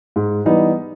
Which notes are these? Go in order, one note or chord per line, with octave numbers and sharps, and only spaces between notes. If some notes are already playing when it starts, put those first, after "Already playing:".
G#2
E3 G3 B3 D#4